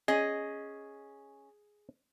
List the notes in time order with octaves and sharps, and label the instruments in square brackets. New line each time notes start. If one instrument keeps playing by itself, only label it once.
[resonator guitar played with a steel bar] C#4 D#5 [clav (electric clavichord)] G#4